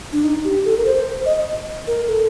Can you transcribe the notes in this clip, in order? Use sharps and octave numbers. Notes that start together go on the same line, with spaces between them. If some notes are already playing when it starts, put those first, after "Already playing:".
D4
D#4
G4
A4
A#4
C5
D#5
A#4
A4